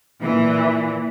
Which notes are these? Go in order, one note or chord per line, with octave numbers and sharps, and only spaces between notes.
A#2 E3